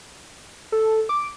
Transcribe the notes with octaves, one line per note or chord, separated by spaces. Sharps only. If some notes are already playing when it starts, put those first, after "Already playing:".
A4
D6